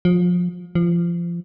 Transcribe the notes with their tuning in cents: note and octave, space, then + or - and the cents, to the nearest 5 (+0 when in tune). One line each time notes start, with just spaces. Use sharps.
F3 +25
F3 -25